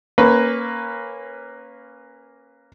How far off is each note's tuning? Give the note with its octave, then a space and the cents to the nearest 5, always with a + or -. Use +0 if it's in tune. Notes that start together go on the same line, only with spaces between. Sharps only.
A#3 +0 C#4 -15 B4 +10